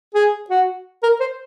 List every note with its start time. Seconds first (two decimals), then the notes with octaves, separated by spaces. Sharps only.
0.14 G#4
0.50 F#4
1.03 A#4
1.20 C5